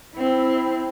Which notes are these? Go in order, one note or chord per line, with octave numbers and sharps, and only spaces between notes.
C4 E4